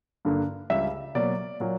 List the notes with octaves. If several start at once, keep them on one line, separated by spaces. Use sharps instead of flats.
G2 D3 A#3
C#2 C#3 G3 E5
B2 F#3 A#3 D5
A#2 F#3 A#3